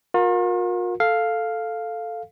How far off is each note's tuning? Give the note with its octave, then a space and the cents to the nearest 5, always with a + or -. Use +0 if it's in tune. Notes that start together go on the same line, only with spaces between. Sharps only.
F4 +45 A#4 +10
A4 +0 F5 +0